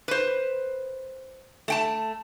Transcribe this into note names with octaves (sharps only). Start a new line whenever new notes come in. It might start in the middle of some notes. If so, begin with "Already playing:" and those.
B4 C5
A3 G5 A5